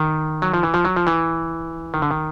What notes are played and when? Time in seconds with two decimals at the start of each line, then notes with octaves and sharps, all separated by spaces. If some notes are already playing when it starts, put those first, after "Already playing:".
Already playing: D#3
0.42 F#3
0.54 F3
0.63 E3
0.74 F3
0.85 F#3
0.96 F3
1.07 E3
1.94 D#3
2.02 D3
2.11 D#3